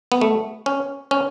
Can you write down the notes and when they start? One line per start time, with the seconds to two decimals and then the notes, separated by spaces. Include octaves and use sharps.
0.12 B3
0.21 A3
0.66 C#4
1.11 C#4